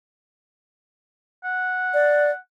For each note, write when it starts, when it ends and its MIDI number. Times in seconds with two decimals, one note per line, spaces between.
1.44 2.36 78
1.94 2.31 74